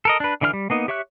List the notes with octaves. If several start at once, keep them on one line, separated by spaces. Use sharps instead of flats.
A4 A#4 D#5
D4 B4
D3 E3 D4 B5 F6
G3
A#3 B3 D#4
G4 C#5 E5 C#6 F#6